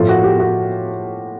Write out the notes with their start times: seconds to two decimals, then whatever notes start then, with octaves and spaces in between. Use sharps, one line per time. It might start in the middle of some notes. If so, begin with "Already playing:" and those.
Already playing: A2 F3 A3 F4
0.09 F#4
0.24 G4
0.40 F#4